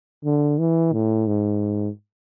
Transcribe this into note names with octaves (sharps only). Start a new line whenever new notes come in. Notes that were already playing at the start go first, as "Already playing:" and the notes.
D3
E3
A2
G#2